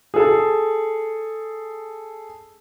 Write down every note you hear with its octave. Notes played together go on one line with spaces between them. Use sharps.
G#4 A4